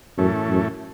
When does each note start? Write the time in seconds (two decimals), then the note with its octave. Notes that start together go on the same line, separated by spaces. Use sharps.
0.18 F#2 A2 E3 A3 C#4 E4
0.49 F#2